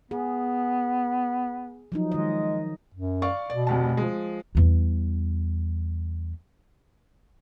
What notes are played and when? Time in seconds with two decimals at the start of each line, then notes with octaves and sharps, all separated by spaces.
0.11 B3 G#4
1.92 F3 F#3 D#4
2.12 D#3 G#3 D#5
2.94 F#2
3.22 D5 F5 C#6
3.50 B2 D5
3.67 F1 D2 A5
3.97 F3 G#3
4.55 E2 G3